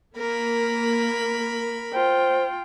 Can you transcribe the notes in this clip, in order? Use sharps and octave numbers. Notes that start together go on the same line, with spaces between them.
A#3 A#4 B5
F4 C5 G5